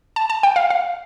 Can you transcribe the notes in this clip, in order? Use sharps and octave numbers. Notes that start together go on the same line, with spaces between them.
A5
A5
G5
F5
F5